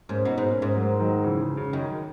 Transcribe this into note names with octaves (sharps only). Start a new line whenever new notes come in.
G#2 A#3 C#4
B2 B3 D#4
G#2
A#3 C#4
G#2
F#3 A#3
D#3 F#3
C#3 E3
C#3
C#3
F#2 D#3